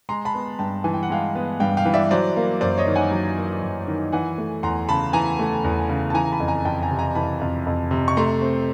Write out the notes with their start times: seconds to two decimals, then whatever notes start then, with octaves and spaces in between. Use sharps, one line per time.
0.09 G#3 A#5 C6
0.25 A5 B5
0.34 B3
0.59 G2 G5 A5
0.84 E3 G#5
0.94 G5
1.03 F#5
1.10 G#3 F5 G5
1.35 B3
1.60 G2 F5 G5
1.77 F5 G5
1.85 E3
1.94 D5 E5
2.11 F#3 C5 D5
2.36 A#3
2.61 F#2 C5 D5
2.78 C#5 D#5
2.87 D#3
2.95 F#5 G#5
3.11 F#3
3.38 A#3
3.63 F#2
3.87 D#3
4.12 E3 F#5 G#5
4.38 A3
4.63 E2 A#5 C6
4.89 C#3 A5 B5
5.13 E3 G#5 A#5
5.39 A3
5.64 E2
5.89 C#3
6.10 A5
6.14 E3 G#5 A#5
6.25 A#5
6.32 A5 B5
6.40 F2
6.48 G#5 A#5
6.65 F2 G5 A5
6.82 G#5 A#5
6.91 C3
6.99 G#5 A#5
7.15 E3 A5 B5
7.41 F2
7.67 F2
7.91 C3
8.08 C#6
8.17 A3 A#5 C6
8.41 C4